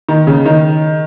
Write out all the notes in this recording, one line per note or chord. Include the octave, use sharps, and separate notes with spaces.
D#3
C#3
D#3